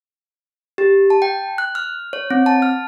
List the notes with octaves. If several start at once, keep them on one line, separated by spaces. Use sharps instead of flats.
G4
A5
G5
F#6
F6
C#5
C4
A5
F6